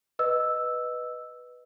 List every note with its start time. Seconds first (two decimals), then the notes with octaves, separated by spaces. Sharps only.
0.19 B4 D#5 E6